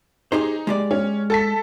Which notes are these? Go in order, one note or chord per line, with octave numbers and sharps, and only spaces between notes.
D#4 G4 G#4 C5
G#3 G4 D5
C#4
A4 A5 B6